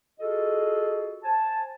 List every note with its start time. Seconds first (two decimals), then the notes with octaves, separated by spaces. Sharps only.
0.20 F4 F#4 G#4 A4 D#5
1.23 C5 G#5 A5